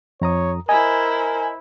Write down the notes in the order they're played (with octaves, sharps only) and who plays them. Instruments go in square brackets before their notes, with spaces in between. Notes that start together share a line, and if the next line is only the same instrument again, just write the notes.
[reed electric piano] F2 A#5 D#6 [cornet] C#5
[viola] E4 C5 [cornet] A#4 [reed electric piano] D#5 [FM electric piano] G#5